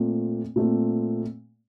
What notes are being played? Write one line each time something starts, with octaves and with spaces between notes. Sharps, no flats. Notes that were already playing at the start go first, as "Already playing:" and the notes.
Already playing: A#2 A3 C4
A#2 A3 C4